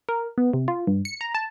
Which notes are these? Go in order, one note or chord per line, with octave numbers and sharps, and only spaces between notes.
A#4
B3
C3
F4
G2
C#7
A#5
A5